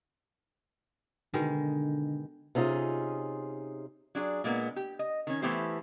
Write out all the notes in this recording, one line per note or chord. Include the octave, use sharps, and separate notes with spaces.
B2 D3 D#3 G#3
C3 C#4 D#4 F4 G#4
F#3 D4 G#4
A#2 G#3 A#3 B3
G4
D#5
D#3 C#4
E3 A3 B3 E4 G4 C5